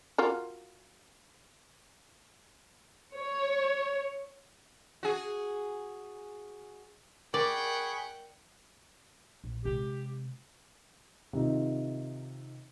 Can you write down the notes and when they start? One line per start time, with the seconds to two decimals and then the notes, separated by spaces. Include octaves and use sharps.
0.18 F4 F#4 A#4
3.16 C#5
5.03 F#4 G#4
7.34 G#4 A#4 D5 F#5 G5 B5 C#6
9.44 A#1
9.65 C3 G#3 G4
11.33 C3 D#3 D#4 F4